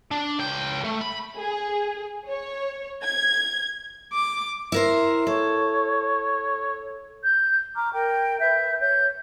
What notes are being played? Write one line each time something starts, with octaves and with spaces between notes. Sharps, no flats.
D4
C#2 G5
A3
B5
G#4
C#5
G#6
D6
E4 A#4 C5
A4 C#5
G6
A#5 C#6 D6 F6
A#4 G5
B4 E5 G6
C#5 G6